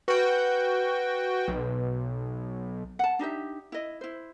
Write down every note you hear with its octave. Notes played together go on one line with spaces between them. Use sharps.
F#4 B4 G5
B1
F#5 A5
D4 D#4 G4 E5
E4 D#5
E4 C5